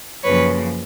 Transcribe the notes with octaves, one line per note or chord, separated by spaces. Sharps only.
F#2 C#3 F3 A#3 B4 C#5